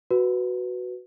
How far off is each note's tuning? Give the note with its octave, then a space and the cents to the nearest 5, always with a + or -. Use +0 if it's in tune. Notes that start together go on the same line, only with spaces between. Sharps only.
F#4 +0 B4 +0